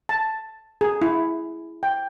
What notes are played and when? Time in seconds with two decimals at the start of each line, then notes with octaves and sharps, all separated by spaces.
0.09 A5
0.81 G#4
1.02 E4
1.83 G5